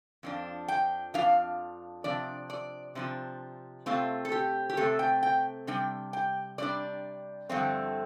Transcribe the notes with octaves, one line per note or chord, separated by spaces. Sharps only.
F2 F3 D4
G5
F2 F3 D4 F5
C3 F3 D4 D5
D5
C3 F3 D4 C5
C3 A3 C4 F4
A4
G4
G4
C3 A3 C4 A4
G5
G5
C3 G3 D4 G5
G5
C3 G3 D4 D5
G2 D3 F3 A3 C4